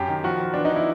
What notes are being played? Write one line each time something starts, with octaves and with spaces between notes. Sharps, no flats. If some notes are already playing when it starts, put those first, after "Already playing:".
Already playing: F#2 G4
D#3
F3 F#4
F3
E3 D4
D#4
E3 E4